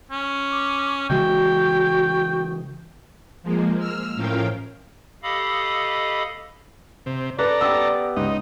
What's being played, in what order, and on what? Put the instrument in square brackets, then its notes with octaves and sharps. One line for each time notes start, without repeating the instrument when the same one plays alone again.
[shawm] C#4
[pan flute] D6
[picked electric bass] C#3 E3 G#3 [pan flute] F#4 [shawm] G5
[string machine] F3 G#3 A#3
E6 F6
A2 F3 C#4 A#4 F5 G5
[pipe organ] G4 A4 D#5 F5 B5 D#6
[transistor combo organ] C3
[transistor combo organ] A4 A#5 [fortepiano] B4 [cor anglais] D5
[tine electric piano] B3 G4 [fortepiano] E6
[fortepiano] C#2 [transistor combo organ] D#4